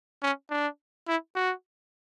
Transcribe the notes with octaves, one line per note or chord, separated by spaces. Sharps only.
C#4
D4
E4
F#4